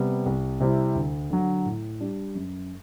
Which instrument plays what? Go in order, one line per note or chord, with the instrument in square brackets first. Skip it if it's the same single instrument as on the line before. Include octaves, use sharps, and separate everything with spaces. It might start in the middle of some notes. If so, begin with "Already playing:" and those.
Already playing: [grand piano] C3 G3 B3
C2
C3 G3 C4 E4
D2
D3 F#3
A2
G3 D4
F#2